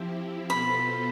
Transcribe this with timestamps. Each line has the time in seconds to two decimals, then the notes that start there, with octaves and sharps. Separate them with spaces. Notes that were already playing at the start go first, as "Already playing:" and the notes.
Already playing: F3 C4 E4 G4
0.50 B2 B3 F4 A4 C5 B5